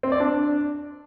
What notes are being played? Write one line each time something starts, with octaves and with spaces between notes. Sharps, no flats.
C4
D5
D4